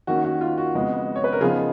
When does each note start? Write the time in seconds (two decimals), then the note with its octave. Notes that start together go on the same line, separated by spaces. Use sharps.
0.07 D#3 A#3 C#4 F#4
0.24 F#4
0.41 F4
0.58 F#4
0.75 F2 C#3 G#3 B3
1.16 C#5
1.24 B4
1.33 A#4
1.40 C#3 F3 B3 D#4 F4 G#4